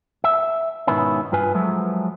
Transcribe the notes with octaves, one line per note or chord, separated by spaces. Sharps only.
E5
G#2 B2 D#3 B3 C#4 E4
G2 F4 B4 G#5
F3 F#3 G#3 A3